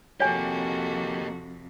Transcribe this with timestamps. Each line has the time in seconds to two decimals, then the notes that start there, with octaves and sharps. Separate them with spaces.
0.20 F2 C3 A#3 F#4 G4 A4 C#5 G#5